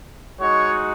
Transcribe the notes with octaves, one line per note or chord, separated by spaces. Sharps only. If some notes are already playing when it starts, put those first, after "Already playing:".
G#3 D#4 F#4 C#5